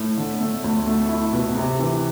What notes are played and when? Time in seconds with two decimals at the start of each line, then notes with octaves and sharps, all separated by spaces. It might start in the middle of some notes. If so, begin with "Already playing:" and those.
Already playing: A2
0.17 D3
0.41 A3
0.64 D2
0.87 A3
1.09 E4
1.33 B2
1.55 C3
1.79 E3